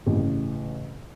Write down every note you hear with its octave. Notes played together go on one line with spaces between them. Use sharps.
A1 C#3